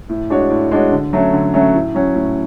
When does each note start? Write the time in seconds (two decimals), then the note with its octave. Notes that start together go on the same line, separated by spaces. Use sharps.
0.09 A2
0.30 G#3 D4 F#4 C#5
0.50 A2
0.71 G#3 D4 F#4 C#5
0.92 D3
1.13 F#3 A3 C#4
1.33 D3
1.54 F#3 A3 C#4
1.74 A2
1.95 F#3 C#4
2.15 A2